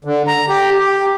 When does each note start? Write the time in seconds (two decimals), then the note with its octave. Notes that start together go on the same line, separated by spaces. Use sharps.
0.05 D3
0.27 A#5
0.49 G4
0.78 G4